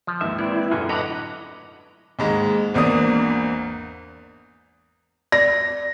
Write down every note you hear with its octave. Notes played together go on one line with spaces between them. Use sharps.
F3
D#2 G#2 E3 E5
C4 E4 B4 D5
F#2 D3 F4 F#4 G#4
A2 B4 D#5 F#5 A#5 B5 D6
D#2 G#2 G#3
G#1 E2 A#3 D4 D#6
D5 A#6